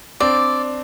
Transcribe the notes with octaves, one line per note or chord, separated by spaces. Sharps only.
C4 D4 D5